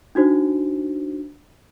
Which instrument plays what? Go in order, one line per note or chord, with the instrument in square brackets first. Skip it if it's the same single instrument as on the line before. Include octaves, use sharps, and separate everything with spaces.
[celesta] D4 D#4 F#4 C5